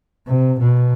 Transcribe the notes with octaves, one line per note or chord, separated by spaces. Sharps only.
C3
B2